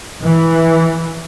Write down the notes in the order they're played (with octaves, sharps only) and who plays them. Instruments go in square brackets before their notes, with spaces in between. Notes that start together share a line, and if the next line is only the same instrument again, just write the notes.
[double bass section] E3